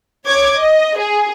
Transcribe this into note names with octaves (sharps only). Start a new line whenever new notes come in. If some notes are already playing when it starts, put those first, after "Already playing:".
C#5 D6 G#6
D#5
G#4